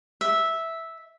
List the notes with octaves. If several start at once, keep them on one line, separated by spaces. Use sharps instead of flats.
E5